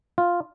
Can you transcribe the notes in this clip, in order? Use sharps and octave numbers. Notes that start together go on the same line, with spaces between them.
F4